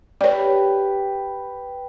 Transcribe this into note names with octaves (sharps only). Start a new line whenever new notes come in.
G4 B4 C#5 D5